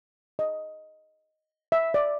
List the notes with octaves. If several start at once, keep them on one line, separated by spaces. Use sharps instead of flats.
D#5
E5
D5